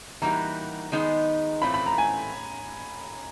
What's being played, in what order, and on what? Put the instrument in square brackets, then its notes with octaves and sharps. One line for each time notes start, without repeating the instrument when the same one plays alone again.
[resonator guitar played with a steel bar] E3 G3 A#3 D#4 F#4 [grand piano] A#5
[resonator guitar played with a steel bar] D#3 G#3 B3 D#4 G#4
[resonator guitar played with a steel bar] A2 E3 A3 C4 F4 [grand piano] B5
[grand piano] B5
A#5
G#5